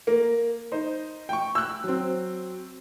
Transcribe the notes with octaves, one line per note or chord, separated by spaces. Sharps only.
A#3
D#4 C5
G5 C#6
E6 F#6
F#3 C4